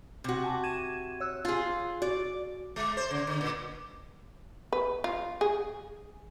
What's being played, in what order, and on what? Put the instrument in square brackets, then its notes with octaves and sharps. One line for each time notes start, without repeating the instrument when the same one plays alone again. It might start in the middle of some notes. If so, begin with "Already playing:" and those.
[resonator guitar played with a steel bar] C3 F#4
[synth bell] G#5 A5 D6
G#6 D#7 E7
C#5 E6 F#6
[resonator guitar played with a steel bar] F4 G#4
[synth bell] F#4 [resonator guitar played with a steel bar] D5
[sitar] G#3
C5
C#3
D3
A#2
[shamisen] B4
F4
G#4